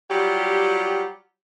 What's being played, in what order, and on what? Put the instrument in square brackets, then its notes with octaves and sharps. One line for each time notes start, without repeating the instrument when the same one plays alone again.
[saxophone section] F#3 G3 F4 G4